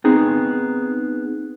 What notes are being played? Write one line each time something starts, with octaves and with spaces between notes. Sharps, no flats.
B3 C4 D#4 G#4